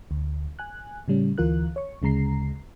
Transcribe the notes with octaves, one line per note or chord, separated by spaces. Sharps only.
D2
G#5 F#6
A2 C#3 G3 C#4
D2 E3 F4 A#4 F#6
C#5 C#6
D2 C#3 G#3 A#5 C7